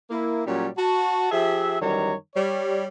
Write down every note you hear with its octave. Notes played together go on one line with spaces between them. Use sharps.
A#3 E4
A#2 F#3 G3 C#4 G4 C#5
F#4 A5
F3 G4 G#4 E5
F#2 D#3 E3 G3 C#5 A#5
G3 C#5